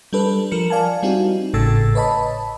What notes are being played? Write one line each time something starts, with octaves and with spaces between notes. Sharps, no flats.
G3 D4 A4 B4
F3 A#4 C#7
D5 F5 G#5 A5
G3 C4 D#4 E4 F#4
G#1 A2 C#3 A4 E6 A6
B4 C#5 D#5 A5 B5